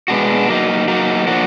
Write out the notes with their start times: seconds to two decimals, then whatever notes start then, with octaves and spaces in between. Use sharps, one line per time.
0.08 B2 G#3 B3 D4 F#4
0.49 F#3 A#3 D#4
0.88 F#3 A#3 D#4
1.27 F3 A#3 D4 F#4